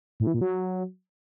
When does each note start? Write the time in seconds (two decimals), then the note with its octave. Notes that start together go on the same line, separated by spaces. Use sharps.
0.20 A2
0.27 E3
0.34 A#2
0.41 F#3